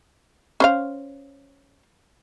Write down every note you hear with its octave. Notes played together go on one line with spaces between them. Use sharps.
C#4 C5 F5